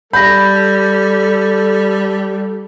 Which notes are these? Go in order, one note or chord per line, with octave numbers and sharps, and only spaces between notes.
G3 A4 B5 G6 A#6